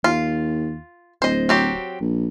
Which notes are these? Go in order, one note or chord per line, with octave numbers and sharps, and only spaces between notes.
D#2 F4
D1 C5 D#5
F#3 C4 G4
A#1